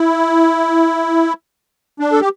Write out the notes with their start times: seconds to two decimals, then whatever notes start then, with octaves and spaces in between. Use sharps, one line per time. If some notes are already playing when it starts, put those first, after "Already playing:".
Already playing: E4
2.00 D4
2.12 A4
2.21 G4